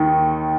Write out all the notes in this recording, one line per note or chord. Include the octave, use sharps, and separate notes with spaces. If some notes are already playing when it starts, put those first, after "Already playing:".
Already playing: D#2 D#3